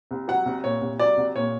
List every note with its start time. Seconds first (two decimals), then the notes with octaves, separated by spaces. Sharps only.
0.11 C2
0.28 F#3 F#5
0.46 C2
0.64 A#2 C#5
0.81 C2
0.99 F#3 D5
1.17 C2
1.36 A#2 C#5